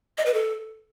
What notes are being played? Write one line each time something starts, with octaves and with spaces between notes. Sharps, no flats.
D#5
B4
A4